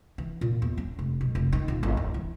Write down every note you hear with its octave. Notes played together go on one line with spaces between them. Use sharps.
E3
A#2
E2
C#4
F1
B1
F1
D#3
D#1
G#1
E2
E3